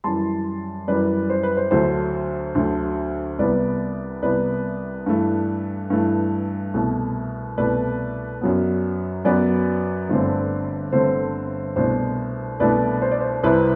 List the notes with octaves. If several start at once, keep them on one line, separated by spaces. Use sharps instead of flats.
F#2 E3 G3 A5 C6
F#2 E3 G3 B4 D5
C5
B4
C5
D2 D3 F#3 A3 C5
D2 D3 F#3 A3
C2 C3 G3 B3 B4 D5
C2 C3 G3 B3 B4 D5
G2 E3 A3
G2 E3 A3
C2 B2 A3
C2 B2 A3 B4 D5
F#2 F#3 B3
F#2 F#3 B3 B4 D5
G1 G2 D3 A3 C4
G1 G2 D3 A3 C4 C5
C2 B2 A3 D4 C5
C2 B2 A3 D4 B4 D5
C5
D5
C5
C2 C3 G3 C4 E4 B4